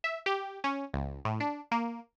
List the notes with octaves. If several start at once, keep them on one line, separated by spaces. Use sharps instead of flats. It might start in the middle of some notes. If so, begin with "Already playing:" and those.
E5
G4
C#4
C#2
A2
D4
A#3